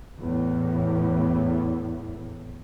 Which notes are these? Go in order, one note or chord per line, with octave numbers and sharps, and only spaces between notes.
E2 A2